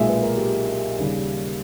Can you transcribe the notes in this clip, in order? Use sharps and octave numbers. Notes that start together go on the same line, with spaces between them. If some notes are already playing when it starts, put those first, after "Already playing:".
Already playing: B1 A#2 G#3 E5
B4
A#4
G4
D#2 C#3 G3